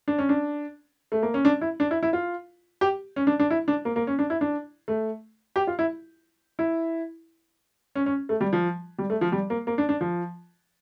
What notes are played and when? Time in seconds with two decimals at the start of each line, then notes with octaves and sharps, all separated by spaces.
0.08 D4
0.18 C#4
0.29 D4
1.12 A3
1.22 A#3
1.34 C#4
1.45 D4
1.61 E4
1.80 D4
1.91 E4
2.03 E4
2.13 F4
2.81 G4
3.16 C#4
3.27 D4
3.40 D4
3.50 E4
3.68 D4
3.85 A#3
3.96 A#3
4.07 C#4
4.19 D4
4.30 E4
4.41 D4
4.88 A3
5.56 G4
5.67 F4
5.79 E4
6.59 E4
7.95 C#4
8.06 C#4
8.29 A3
8.41 G3
8.53 F3
8.99 G3
9.10 A3
9.21 F3
9.32 G3
9.50 A#3
9.67 A#3
9.78 D4
9.89 D4
10.01 F3